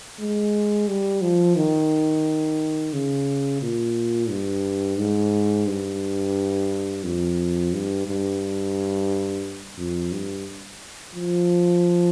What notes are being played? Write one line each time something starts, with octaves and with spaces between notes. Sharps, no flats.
G#3
G3
F3
D#3
C#3
A#2
G2
G#2
G2
F2
G2
G2
F2
G2
F3